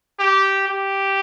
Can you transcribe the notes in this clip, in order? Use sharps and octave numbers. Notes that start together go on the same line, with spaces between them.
G4
G4